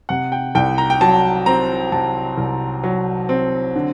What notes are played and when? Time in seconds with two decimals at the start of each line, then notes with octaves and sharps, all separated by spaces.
0.09 C3 F#5
0.32 G5
0.55 C2 G5
0.78 A#5
0.90 G5
1.01 F#3 A5
1.46 C4 A#5
1.92 C3 A5
2.38 C2
2.84 F#3
3.29 C4
3.75 D3